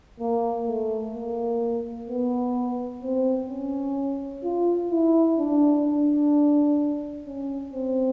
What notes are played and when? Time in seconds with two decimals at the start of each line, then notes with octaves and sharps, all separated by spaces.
0.20 A#3
0.67 A3
1.14 A#3
2.08 B3
3.03 C4
3.49 C#4
4.44 F4
4.91 E4
5.38 D4
5.85 D4
7.26 C#4
7.73 C4